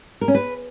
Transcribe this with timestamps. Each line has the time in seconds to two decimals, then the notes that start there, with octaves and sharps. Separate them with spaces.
0.21 A#4
0.28 C#4
0.35 B4